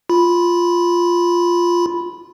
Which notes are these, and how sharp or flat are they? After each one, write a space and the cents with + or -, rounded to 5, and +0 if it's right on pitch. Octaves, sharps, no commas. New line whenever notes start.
F4 +0 B5 -5